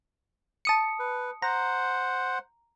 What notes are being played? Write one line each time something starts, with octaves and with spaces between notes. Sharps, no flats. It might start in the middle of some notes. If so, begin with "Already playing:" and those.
A5 D#6 C#7
B4
C5 F#5 A#5